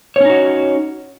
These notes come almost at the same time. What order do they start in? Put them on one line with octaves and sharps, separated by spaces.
C#5 C#4 D#4 F#4